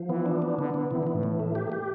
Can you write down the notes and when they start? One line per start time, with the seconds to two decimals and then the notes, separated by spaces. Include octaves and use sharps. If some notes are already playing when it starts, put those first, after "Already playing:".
Already playing: F3
0.09 E3 B3
0.26 D4
0.42 B3
0.58 D3 B3
0.74 D3 B3
0.91 C3 E3
0.98 D3
1.07 E3
1.15 A2
1.23 E3
1.40 A3
1.55 G4
1.72 G4